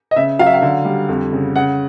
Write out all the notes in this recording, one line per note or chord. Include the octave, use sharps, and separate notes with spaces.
D#5
C#3 E5
F#3 F5
E5
F5
D3
G3
F2
C#3
C#3 F#5